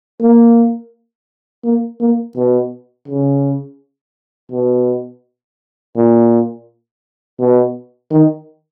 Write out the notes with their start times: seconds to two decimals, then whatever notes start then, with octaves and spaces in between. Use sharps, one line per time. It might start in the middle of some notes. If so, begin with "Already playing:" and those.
0.22 A#3
1.65 A#3
2.01 A#3
2.36 B2
3.08 C#3
4.52 B2
5.96 A#2
7.40 B2
8.11 D#3